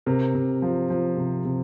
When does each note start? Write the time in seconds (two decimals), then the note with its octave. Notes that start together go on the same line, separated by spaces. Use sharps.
0.06 C3 A#4
0.35 C3
0.62 F3
0.90 F3
1.17 C3
1.45 C3